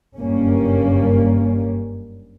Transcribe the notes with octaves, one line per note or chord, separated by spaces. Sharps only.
F#1 G2 G3 A#3 C#4